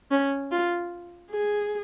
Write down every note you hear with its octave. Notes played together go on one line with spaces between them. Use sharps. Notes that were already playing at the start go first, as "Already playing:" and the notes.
C#4
F4
G#4